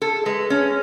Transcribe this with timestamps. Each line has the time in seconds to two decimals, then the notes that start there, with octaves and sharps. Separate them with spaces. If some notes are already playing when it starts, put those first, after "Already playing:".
0.02 G#4 A4
0.26 G#3 B4
0.50 C#4